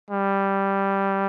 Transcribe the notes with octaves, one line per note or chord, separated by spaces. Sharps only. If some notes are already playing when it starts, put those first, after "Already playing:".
G3